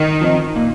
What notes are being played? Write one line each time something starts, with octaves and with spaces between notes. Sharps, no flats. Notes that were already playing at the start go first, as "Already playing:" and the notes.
Already playing: D#3
F3 C4 D#4
A#2